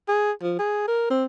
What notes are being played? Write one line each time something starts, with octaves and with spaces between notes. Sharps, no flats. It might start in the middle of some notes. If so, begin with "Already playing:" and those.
G#4
F3
G#4
A#4
C4